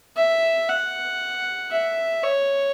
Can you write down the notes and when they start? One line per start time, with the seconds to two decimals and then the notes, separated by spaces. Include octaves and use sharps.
0.17 E5
0.68 F#5
1.71 E5
2.23 C#5